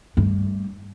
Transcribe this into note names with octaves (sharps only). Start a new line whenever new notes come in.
G2 A3